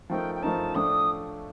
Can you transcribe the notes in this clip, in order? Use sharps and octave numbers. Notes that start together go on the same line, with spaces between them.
F3 A3 D#4 A#4 G5
G5
F3 A3 D#4 A#4 A5
A2 F3 A3 D4 A4 D#6